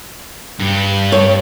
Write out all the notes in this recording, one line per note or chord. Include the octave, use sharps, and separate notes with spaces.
G2
C#5